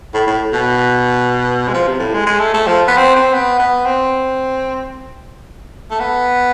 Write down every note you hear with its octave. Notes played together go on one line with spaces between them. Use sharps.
A2
A2
B2
G#3
F3
C3
A2
G#3
G#3
A3
A3
F3
B3
C4
C4
B3
B3
C4
A3
B3